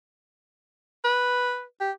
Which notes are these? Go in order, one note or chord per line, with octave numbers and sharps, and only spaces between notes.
B4
G4